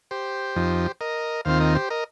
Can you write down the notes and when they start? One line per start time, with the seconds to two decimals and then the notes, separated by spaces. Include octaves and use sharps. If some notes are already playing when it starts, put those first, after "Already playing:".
0.11 G4 C5
0.56 F2 F3 D#4
1.01 A#4 D#5
1.45 D#2 D#3 C4 F4 C5 F5
1.60 A#4 D#5
1.75 G4 C5
1.90 A#4 D#5